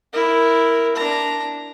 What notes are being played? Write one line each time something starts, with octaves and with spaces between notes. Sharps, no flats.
E4 A#4
D4 A#5